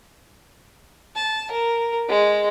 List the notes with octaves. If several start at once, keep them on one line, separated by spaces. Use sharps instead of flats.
A5
A#4
G#3